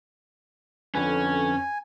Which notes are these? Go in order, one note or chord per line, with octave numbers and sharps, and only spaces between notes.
F2 D3 C#4 B4 G#5